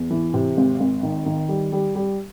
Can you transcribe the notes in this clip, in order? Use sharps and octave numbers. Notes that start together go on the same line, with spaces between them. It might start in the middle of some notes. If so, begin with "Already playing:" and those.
Already playing: E2
E3
C3
G#1
G#1
D#3
D#3
G3
G3
G3